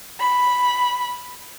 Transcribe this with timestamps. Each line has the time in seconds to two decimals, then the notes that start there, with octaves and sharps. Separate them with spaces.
0.20 B5